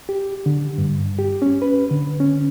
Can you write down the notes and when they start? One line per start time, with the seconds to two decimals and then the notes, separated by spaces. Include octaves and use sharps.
0.09 G4
0.46 D3
0.78 G2
1.19 G4
1.42 C#4
1.62 B4
1.91 D3
2.20 C#4